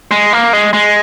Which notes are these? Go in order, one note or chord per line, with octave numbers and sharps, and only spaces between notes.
G#3
A#3
G#3
G#3